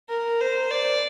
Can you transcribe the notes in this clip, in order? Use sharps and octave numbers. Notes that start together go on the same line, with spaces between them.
A#4
C5
D5